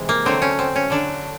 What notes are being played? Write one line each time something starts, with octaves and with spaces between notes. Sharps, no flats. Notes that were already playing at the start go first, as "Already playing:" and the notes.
Already playing: C3 E3 G#3
A#3
D3 F#3 A3 C4
C#4
C4
C#4
D3 F#3 A3 D4